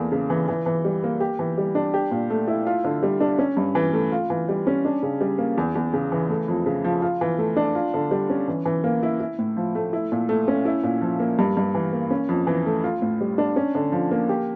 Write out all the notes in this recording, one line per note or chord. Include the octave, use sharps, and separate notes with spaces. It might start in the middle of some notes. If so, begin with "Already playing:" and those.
Already playing: E2 A3 A#3
C#3
E3
E3
E3
G3
A#3
G4
E3
G3
D4
G4
A#2
A3
E4
F4
D3
G3
D4
C#4
G2
E3
A3
F4
E3
G3
C#4
D4
C#3
G3
A#3
E2
E2
C#3
E3
A3
F2
C#3
F3
F4
E3
A3
D4
F4
D3
G3
C#4
E3
E3
A#3
E4
E4
A2
F3
A3
E4
A#2
A3
C#4
E4
A#2
F3
A#3
G2
G2
E3
A#3
C#4
F2
E3
A3
F4
A2
G3
D4
C#4
D3
F3
A#3
G4